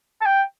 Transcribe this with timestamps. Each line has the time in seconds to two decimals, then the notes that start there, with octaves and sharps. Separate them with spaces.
0.21 A5
0.26 G5